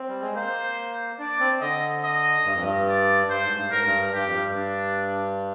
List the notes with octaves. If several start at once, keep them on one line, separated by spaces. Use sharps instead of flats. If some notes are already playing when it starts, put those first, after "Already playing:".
Already playing: C4
G3
G#3
A#3 C5
D4 D5
C4
D3 D#5
D#5
G2
F2
G2
D5
G2 C5
G#2
G2
G#2 A#4
G2
G2 G4
F2
G2
D4